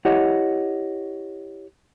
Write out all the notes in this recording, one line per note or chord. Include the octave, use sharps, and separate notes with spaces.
E4 G4 C#5 D#5 F#5